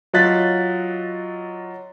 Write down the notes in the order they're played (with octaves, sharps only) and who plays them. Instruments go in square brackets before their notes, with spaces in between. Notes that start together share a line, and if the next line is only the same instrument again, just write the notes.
[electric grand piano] F#3 F4 D#5 F#6 A6 B6